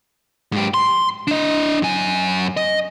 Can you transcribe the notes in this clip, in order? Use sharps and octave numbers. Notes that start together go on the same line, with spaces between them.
G#2 G4
C6
D4 D#5
F#2 G#5
D#5